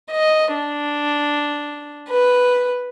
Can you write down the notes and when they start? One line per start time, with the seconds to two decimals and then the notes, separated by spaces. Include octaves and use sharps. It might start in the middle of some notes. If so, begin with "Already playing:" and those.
0.12 D#5
0.55 D4
2.10 B4